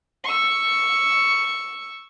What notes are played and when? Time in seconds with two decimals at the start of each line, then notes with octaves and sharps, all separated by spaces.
0.24 C#6 E6